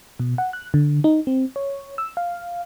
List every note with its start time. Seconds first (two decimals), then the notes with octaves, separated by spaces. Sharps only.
0.20 B2
0.38 F#5
0.53 F#6
0.74 D3
1.04 D#4
1.27 C4
1.56 C#5
1.98 E6
2.17 F5